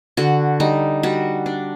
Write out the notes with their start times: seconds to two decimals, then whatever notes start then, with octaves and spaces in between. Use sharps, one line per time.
0.17 D3 F#4
0.60 G3 D#4
1.03 G3 F#4
1.46 D4